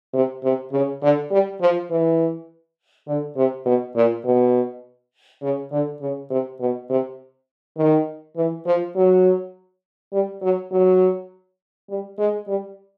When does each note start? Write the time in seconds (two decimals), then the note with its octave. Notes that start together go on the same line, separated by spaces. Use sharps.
0.13 C3
0.43 C3
0.72 C#3
1.02 D3
1.31 G3
1.61 F3
1.90 E3
3.07 D3
3.36 C3
3.65 B2
3.95 A#2
4.24 B2
5.42 C#3
5.71 D3
6.01 C#3
6.30 C3
6.60 B2
6.89 C3
7.77 D#3
8.36 E3
8.66 F3
8.95 F#3
10.12 G3
10.41 F#3
10.71 F#3
11.89 G3
12.18 G#3
12.47 G3